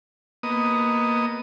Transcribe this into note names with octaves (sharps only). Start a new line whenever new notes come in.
A#3 B3 D#5 D#6